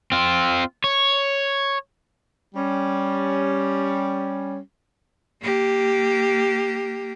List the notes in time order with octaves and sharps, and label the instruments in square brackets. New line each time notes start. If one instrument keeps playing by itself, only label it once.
[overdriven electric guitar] C4 F4
C#5
[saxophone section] G3 C#4
[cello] A#3 G4